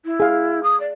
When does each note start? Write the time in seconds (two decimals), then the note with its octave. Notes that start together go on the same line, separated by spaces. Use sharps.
0.05 E4
0.20 G#4 F5
0.63 D#6
0.80 D5